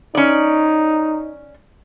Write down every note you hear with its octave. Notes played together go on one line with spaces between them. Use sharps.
C#4 D#4 D5